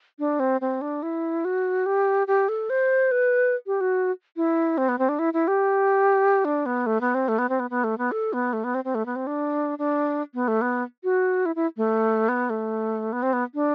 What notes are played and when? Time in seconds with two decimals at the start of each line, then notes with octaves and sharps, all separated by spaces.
0.19 D4
0.40 C4
0.61 C4
0.81 D4
1.03 E4
1.45 F#4
1.86 G4
2.27 G4
2.49 A4
2.70 C5
3.12 B4
3.67 G4
3.81 F#4
4.36 E4
4.78 C4
4.89 B3
4.99 C4
5.09 D4
5.19 E4
5.33 E4
5.48 G4
6.45 D4
6.66 B3
6.86 A3
7.01 B3
7.15 C4
7.28 A3
7.39 B3
7.49 C4
7.60 B3
7.70 B3
7.84 A3
7.98 B3
8.12 A4
8.33 B3
8.53 A3
8.64 B3
8.75 C4
8.85 C4
8.95 A3
9.06 B3
9.16 C4
9.27 D4
9.79 D4
10.34 B3
10.48 A3
10.62 B3
11.04 F#4
11.46 E4
11.56 E4
11.77 A3
12.29 B3
12.50 A3
13.13 B3
13.23 C4
13.33 B3
13.55 D4